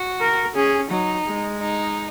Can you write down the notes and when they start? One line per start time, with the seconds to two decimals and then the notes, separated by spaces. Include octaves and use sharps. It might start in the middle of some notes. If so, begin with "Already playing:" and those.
Already playing: F#4
0.21 A#4
0.55 C#4 G#4
0.90 F#3 D#4
1.25 G#3
1.60 D#4